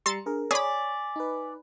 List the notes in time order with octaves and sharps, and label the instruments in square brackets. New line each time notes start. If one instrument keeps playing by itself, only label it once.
[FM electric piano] G3 A#5 C#7 [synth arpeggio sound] C6 E6 A6
[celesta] D4 [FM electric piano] G#4 A#4
[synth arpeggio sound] G#4 B5 [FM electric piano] C#5 [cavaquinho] D5 [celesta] G#5 B6
[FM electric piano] D#4 B4